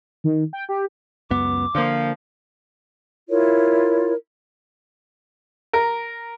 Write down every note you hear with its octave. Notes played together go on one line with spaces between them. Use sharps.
D#3
G5
G4
C#2 F#2 B3 D6
D3 F3 A#3
E4 F4 A#4 C#5
A#4